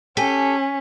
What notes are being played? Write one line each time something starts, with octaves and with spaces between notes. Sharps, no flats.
C#4 G4 A4 G#5 B6